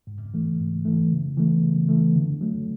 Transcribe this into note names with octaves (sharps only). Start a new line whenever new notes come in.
G#2
E3 A3
G#2
E3 A3
C#3
E3 A3
C#3
E3 A3
D3
F#3 A3